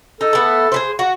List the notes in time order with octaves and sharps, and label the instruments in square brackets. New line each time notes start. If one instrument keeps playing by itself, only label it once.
[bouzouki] D#4 [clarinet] A4
[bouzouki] A3 B3
G#4 B4 C5
F#4